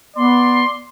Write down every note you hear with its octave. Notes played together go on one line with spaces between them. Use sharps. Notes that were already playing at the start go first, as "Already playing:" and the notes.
B3 D5 C6